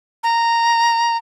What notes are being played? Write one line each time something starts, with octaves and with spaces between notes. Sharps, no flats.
A#5